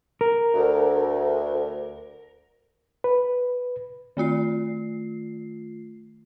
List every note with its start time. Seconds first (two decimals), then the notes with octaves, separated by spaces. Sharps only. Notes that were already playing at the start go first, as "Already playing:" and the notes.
0.21 A#4
0.54 D2
3.04 B4
4.17 D#3 A3 F4 C7